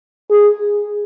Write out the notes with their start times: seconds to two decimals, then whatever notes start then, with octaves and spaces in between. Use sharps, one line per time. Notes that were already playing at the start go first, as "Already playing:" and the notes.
0.30 G#4